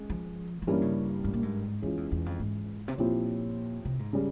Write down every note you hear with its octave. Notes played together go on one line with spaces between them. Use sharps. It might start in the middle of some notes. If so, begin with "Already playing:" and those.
Already playing: G#3 C#4
F3
F3
G2 E3 G3 A#3 C#4 E4
C#3
G#2
A#2
G#2
F2 E3 G#3 C#4 F4
E2
E2
F2
G#2
C3
A#2 F3 C4 E4 G4 C#5
C3
G#2
C#3 G3